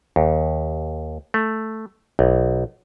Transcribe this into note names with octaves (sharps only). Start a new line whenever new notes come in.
D#2
A3
B1